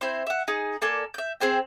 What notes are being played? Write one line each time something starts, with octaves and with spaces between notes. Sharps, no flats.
C4 E4 C5
E5 F#5
D#4 G#4
A#3 A4 D5 G#5
E5 G6
C4 G#4 C5 G5